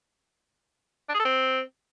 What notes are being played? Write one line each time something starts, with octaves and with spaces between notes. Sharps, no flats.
D4
G#4
A4
C4